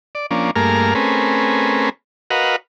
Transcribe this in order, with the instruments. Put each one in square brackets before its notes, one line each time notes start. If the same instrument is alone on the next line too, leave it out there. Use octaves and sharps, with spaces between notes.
[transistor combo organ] D5
F3 A#3 C#4 D4
G2 A3 A#3 G#4 A#4 F6
A3 C4 C#4 G#4 A#4 B4
F#4 A#4 B4 D#5 F5 F#5